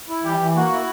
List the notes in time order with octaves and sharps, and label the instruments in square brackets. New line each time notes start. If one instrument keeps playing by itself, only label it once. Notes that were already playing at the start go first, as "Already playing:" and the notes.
[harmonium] E4
[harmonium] E3 [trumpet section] G3 G4
[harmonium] E3
[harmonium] A#3 [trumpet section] F#4
[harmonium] E4